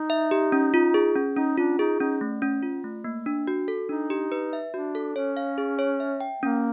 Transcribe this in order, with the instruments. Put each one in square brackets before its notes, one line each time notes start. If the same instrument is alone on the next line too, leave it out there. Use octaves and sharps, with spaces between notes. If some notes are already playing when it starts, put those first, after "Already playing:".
Already playing: [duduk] D#4
[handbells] E5
G4
C#4
F4
G#4
C#4
[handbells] C#4 [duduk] D#4
[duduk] D4 [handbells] F4
[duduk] D#4 [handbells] G#4
[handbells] C#4 [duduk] D#4
[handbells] A3
C#4
F4
A3
A#3
D4
F#4
A4
[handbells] D4 [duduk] D#4
[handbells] G4
B4
E5
[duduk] D4 [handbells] F#4
[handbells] A4
[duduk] C#4 [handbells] C#5
[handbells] F5
G#4
C#5
E5
G5
[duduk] A#3 [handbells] C#4